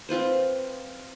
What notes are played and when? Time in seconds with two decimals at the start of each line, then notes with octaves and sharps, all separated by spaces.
0.09 C4 F4 B4 C5